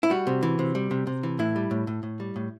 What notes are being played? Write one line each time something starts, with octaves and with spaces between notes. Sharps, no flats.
E4
G3 F#4
C3
E3
C3
G3
C3
C3
E3
A2 E4
G3
A2
A2
A2
G3
A2